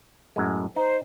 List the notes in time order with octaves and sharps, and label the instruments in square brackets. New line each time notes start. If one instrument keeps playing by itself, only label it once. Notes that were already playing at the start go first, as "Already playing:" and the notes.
[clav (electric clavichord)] F#2 A2 G#3
[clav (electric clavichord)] D#4 [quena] C5